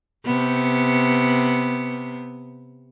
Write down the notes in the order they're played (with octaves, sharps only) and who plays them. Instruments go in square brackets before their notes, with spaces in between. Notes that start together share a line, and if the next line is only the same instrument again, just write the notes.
[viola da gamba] C3 B3